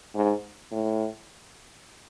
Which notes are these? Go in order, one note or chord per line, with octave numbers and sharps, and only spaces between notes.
G#2
A2